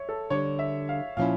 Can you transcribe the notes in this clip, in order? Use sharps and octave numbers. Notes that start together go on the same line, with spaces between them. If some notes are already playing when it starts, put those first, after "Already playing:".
Already playing: C#5 E5
A4
D3 G3 D4 C#5
E5
F5
A#2 F3 C#4 E4 F5